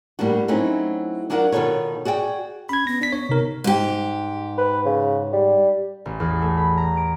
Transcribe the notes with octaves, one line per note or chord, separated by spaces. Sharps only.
A2 G3 A#3 D4 F#4
F#3 A3 C4 C#4 D#4 E4
F#3 D4 E4 F4 A#4 F#5
B2 D#3 F4 A4 B4 C#5
F#4 G#4 D5 F5 G5
C#4 B5 G#6
B3 A#6
B3 D4 B6
C#5
C3 D#4 A#4
G#2 G4
B4
C#3
G3
A1
E2
A3
B5
A#5
D7